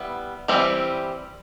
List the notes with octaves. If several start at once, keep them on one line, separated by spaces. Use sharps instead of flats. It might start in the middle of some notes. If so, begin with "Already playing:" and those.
Already playing: G3 B3 E4
E3 G3 C4 E4 G4